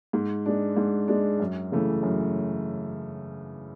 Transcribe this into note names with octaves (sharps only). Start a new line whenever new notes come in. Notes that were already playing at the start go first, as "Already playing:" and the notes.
G#2
G#3 D4
G#2
G#3 D4
F#2
C#3 E3 A3
F#2